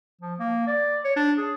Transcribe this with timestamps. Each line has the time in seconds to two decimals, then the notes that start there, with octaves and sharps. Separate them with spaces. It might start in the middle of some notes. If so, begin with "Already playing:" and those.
0.21 F3
0.39 A#3
0.67 D5
1.04 C#5
1.16 D4
1.38 G#4